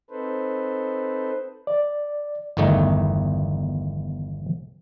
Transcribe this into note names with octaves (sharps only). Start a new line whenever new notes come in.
C4 D#4 A4 B4 C5
D5
G1 E2 D#3 A3 D#4